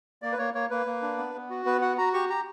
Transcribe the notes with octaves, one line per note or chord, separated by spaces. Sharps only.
A#3 D5
B4
A#3 C#5
A#3 C#5
A#3 B4
A#3
D4
B3
B3
F#4
B3 B4
F#4 F#5
F#4 A#5
G4 C#6
G4 A#5